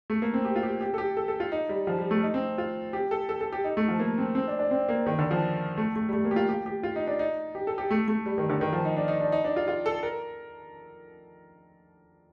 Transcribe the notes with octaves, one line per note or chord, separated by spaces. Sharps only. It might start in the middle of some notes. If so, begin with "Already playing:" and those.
A3
A#3
C4
G4
F4
G4
G4
A4
G4
A4
A4
F4
D#4
G3
F3
G3
A3
D#4
C4
F4
G4
A4
A4
A4
G4
D#4
A3
F3
A#3
C4
C4
D4
D4
C4
A#3
D#3
D3
F3
A3
A3
G3
A3
A#3
G4
F4
G4
G4
F4
D#4
D4
D#4
G4
A4
G4
A3
A3
G3
D#3
D3
D#3
F3
D#4
D4
D#4
D4
D#4
D4
F4
F4
A4
A#4